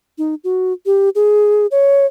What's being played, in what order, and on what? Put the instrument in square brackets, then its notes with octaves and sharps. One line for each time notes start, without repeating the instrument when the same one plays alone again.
[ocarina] D#4
F#4
G4
G#4
C#5